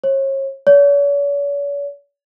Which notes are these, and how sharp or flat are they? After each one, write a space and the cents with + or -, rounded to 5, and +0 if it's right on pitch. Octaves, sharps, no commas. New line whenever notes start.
C#5 -35
C#5 +45